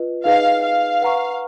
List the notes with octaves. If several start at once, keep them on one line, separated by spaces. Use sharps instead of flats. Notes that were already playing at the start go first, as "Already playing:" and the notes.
Already playing: F4 B4 D#5
D#4 G#4 B4 D#5 F5
F5
B4 F#5 A#5 C#6